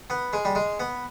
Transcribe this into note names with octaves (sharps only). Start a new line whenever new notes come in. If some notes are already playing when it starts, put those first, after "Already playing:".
B3
G#3
G3
G#3
B3